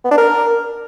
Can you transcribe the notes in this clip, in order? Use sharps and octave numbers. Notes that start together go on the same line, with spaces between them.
B3
D4
A#4